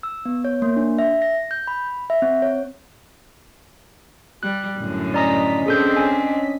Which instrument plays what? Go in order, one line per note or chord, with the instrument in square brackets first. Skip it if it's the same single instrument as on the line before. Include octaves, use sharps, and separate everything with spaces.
[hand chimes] E6
B3
C#5
A#3
D4
E5
A#6
G6
B5
E5
C4
C#5
[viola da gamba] G3 [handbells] F#6
[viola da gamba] F#2 A2 D3
[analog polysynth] C#4 D#5 B6 [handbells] D5 A#5 D#6
[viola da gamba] C4 D4 [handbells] G#4 A4 G6
[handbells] G#5